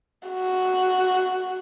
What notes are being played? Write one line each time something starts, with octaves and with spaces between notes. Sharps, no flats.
F#4